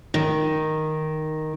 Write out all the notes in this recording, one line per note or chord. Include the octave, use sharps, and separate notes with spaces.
D#3